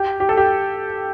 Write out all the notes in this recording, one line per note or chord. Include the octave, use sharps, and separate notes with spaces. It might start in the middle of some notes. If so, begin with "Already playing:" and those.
Already playing: G4
G4
A4
G4